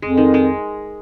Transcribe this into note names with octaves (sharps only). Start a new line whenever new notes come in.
F2 G#3
D#3
G#3